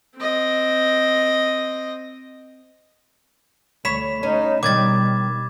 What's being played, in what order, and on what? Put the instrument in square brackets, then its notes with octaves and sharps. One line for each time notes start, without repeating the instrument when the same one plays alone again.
[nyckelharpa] C4 D#5
[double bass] D2 [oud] C#5 [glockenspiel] B5 B6 E7
[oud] C#4 [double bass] D#4
[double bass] B2 [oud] D#3 G3 [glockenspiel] D6 G#6 A6